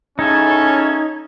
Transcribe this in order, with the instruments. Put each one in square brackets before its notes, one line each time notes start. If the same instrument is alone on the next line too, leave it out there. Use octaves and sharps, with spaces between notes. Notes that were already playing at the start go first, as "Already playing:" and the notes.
[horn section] A2 C#3 A4 [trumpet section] C#4 [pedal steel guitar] D#4 [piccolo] G#6